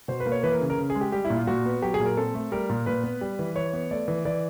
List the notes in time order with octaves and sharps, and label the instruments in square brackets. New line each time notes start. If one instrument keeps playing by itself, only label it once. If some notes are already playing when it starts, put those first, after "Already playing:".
[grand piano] B2 C5
B4
A#3
C#5
E3 B4
A#4
C#3
A#4
C#3
G#4
G#3
G4
G3 G4
E4
A#2
F4
A#2 F#4
B3
F#3 G4
G#4
A#2
A#4
C4 A4
A3
G3 A#4
A#2
A#2 B4
B3
G3
E3
E3 C#5
B3
A3 D5
E3
E3 D5